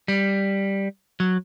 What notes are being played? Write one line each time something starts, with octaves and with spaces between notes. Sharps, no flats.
G3
F#3